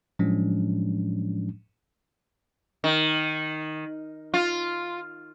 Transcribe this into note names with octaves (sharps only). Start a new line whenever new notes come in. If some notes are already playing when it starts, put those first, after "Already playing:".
A2 F3 F#3 G#3 C#4 D4
D#3
F4